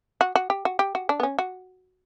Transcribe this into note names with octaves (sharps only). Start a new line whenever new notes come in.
F#4
F#4
G4
F#4
G4
F#4
D4
B3
C#4
F#4